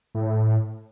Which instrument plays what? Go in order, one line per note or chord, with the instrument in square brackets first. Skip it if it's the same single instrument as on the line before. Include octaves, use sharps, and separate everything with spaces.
[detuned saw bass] A2